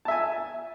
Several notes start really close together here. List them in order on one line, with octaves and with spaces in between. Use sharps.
A5 E5 G#5